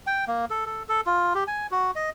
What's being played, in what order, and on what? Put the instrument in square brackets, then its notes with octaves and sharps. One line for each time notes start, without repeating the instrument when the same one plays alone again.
[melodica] G5
A#3
A4
A4
A4
F4
G4
G#5
F#4
D#5